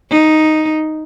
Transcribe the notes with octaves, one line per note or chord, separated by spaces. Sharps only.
D#4